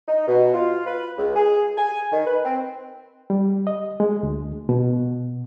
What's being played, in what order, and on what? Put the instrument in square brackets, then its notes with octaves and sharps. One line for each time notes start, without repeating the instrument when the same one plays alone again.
[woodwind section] D#4
B2
F4
B4
C#2
G#4
G#5
D#3
B4
C4
[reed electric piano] G3
D#5
G#3
D2
B2